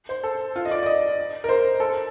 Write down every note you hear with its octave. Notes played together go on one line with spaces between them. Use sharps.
C5
A4
F4
D#5
D5
D5
D#5
A#4
C5
A4